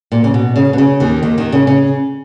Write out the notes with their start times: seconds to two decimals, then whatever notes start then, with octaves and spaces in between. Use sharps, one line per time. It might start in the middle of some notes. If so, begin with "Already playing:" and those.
0.12 A#2
0.24 C#3
0.34 B2
0.56 C#3
0.73 B2
0.78 C#3
1.00 D#2 D#3
1.23 D#2 D#3
1.38 D#2 D#3
1.52 C#3
1.67 C#3